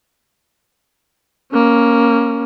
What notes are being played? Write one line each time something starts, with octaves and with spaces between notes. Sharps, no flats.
A#3 C#4